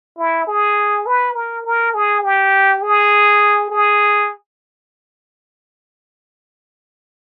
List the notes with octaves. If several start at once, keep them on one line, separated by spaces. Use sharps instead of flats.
E4
G#4
B4
A#4
A#4
G#4
G4
G#4
G#4